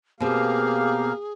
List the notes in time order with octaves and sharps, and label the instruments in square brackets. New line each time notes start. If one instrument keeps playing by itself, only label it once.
[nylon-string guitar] B2 C4 [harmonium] A#3 F5 [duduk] G4 [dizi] G#4